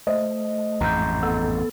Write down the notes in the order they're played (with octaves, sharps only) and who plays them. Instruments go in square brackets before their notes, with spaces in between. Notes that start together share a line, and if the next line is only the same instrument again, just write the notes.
[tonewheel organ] A3 [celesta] C5 [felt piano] D#5
[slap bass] A1 F2 G#2 [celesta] A#5 G6
[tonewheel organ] B3 A4